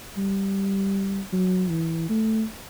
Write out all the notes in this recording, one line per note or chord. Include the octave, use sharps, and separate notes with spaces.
G3
F#3
E3
A3